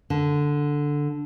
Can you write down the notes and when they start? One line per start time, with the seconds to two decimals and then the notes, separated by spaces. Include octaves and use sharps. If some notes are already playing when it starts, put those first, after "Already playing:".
0.10 D3